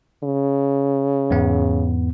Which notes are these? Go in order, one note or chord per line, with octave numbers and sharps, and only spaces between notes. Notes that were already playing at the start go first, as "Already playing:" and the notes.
C#3
E2 G#2 B3